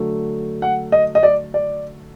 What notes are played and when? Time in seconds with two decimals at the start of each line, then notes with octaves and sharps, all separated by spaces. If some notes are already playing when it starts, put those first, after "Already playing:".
Already playing: D3 F#3 A3
0.62 F#5
0.92 D#5
1.15 D#5
1.23 D5
1.54 D5